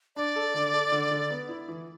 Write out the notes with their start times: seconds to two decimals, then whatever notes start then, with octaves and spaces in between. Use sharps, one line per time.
0.16 D4 D5
0.36 A4
0.54 D3
0.73 A4
0.92 D3
1.11 D3
1.30 B3
1.49 E4
1.68 E3